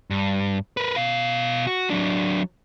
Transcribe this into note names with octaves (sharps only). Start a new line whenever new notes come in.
G2
A#4 B4
B2 F5
F#4
F#3 D4